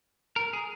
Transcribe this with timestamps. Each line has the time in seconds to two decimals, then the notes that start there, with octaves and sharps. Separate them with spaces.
0.36 A#4
0.53 G#4